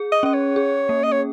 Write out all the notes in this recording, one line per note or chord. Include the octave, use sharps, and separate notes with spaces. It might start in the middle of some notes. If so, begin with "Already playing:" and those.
Already playing: G#4
D#5
C#4 D#5
C#5
G#4
A#3
D#5
C#5